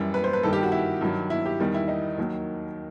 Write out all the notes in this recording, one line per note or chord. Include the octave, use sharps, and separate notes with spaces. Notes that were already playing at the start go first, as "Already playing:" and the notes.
Already playing: F#2 E3 G3
B4
C5
B4
G2 D#3 G3 A4
G4
F#4
E4
G2 D#3 F#3
E4
G4
E2 D#3 G3
E4
D#4
D#2 D#3 F#3